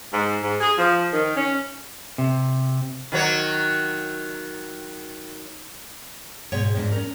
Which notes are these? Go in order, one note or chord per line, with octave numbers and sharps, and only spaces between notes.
G#2
G#2
G#4
F3
D#3
C#4
C3
D#3 F#3 C#5
G#2 B2 G#4 C#5 G5
F2 G#2 D4
C#4 A#4